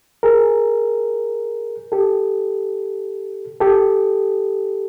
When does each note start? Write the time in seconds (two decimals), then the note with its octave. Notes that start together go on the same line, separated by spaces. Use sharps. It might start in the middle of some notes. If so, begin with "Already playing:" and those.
0.23 G#4 A#4
1.92 G4 A4
3.60 G4 A4